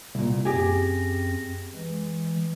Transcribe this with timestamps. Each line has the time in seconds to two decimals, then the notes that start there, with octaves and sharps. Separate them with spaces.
0.15 C2 A#2
0.45 F#2 C4 G4 G#4 A#6
1.75 E3 G#3